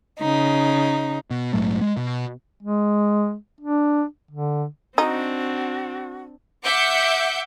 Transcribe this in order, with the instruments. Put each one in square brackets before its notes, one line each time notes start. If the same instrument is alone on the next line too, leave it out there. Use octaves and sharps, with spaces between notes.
[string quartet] C#3 D#4
[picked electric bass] B2
A#1 G#2 F#3 A3
G#3
B2
[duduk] G#3
D4
D3
[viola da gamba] C4 D4 [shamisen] D#4 [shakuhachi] F#4
[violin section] E5 F#5 D6 G6 C#7